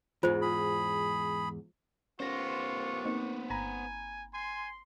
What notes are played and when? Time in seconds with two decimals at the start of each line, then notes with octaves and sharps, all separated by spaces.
0.23 E2 G#2 F4 C5
0.42 G#4 B5
2.20 D#2 B3 C#4 D4 F4 C5 C#6 A#6
3.05 A#3 C4 D#4
3.50 G1 G#5 A#5 B5
4.33 G#5 C6